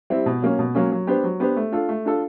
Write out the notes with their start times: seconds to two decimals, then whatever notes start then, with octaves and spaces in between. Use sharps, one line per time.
0.10 G3 C4 E4
0.26 B2
0.42 F#3 A#3 C#4
0.59 B2
0.75 F#3 A#3 C#4
0.92 F#3
1.07 B3 D4 G4 C5
1.24 F#3
1.40 B3 D4 G4 C5
1.56 A3
1.72 D4 F4 A4
1.89 A3
2.05 D4 F4 A4